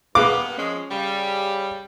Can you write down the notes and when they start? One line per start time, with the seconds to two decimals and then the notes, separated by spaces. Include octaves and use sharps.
0.15 G2 A#3 B3 G#4 B4 F5 D6
0.58 F3 G#3 C#4
0.91 C#3 G3